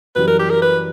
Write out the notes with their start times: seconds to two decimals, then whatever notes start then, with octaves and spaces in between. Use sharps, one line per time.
0.16 F#2 E3 G3 B4
0.27 A#4
0.39 G4
0.50 A#4
0.62 B4